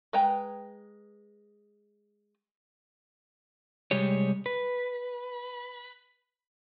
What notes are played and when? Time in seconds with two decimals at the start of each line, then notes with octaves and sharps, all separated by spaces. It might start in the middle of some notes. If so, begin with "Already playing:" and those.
0.13 G#3 B4 G5 A#5
3.91 C3 G3 G#3 G4 C#5
4.46 B4